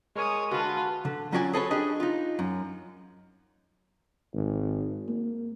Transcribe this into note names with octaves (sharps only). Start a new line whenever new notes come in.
G#3 A#4 C#5 G#5 D#6
D3 F4 F#4 B4 A5
D3
F#3 C#4 F4 F#4 D5 G#5
G#4 A4 B4 C#5
D4 G4 G#4 D#5
D#4 F4
F#2
G#1
A#3